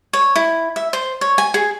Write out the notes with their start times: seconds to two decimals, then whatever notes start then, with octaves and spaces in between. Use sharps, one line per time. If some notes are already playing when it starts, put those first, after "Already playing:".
0.13 C#5
0.36 E4
0.76 E5
0.93 C5
1.21 C#5
1.38 G#5
1.54 G#4